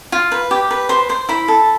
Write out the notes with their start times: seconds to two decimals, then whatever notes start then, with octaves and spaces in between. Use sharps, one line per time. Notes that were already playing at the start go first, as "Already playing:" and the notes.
0.12 F4
0.32 B4
0.51 G4
0.71 B4
0.89 C5 C6
1.09 C5 C6
1.29 E4 B5
1.48 A4